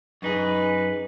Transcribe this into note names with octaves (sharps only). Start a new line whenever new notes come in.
F#2 D#4 G#4 B4